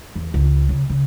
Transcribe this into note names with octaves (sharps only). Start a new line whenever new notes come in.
E2
C#2
C#3
C#3